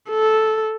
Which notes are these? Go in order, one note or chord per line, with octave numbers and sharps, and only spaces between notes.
A4